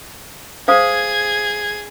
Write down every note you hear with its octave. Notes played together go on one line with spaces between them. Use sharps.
G#4 C5 F5 D#6 G#6